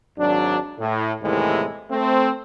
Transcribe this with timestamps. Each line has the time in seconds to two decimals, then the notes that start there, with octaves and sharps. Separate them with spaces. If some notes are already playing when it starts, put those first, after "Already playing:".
0.18 G#1 F#3 D4
0.79 A2
1.22 D#2 A2 C3 E3 G#3
1.90 A3 C4